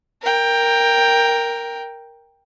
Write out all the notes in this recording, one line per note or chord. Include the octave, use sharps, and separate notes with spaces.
A#4 G5